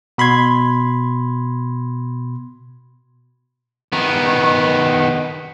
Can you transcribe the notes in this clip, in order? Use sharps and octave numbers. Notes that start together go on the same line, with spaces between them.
B2 B5 C6 G#6
D#3 B3